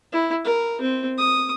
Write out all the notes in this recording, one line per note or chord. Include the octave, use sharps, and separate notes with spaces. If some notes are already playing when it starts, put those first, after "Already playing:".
E4
A#4
C4
D#6